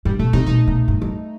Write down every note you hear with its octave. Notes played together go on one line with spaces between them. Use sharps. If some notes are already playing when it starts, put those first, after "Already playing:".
G2 G3
B2 A3
C3 D#4
B2 D#4
B2
G2
F#2